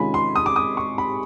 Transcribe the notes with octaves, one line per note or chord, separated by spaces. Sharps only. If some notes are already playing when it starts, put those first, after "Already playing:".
Already playing: C3 D#3 G#3 C#4 F4 G#5 B5
C6
D#6
D6
D#6
C#6
B5